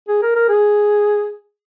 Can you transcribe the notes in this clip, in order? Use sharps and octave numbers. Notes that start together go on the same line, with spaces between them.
G#4
A#4
A#4
G#4